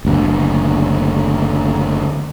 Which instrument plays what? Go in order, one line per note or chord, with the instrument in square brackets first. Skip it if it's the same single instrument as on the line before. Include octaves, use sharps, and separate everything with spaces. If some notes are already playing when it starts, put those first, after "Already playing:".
[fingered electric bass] F#1 D2 B2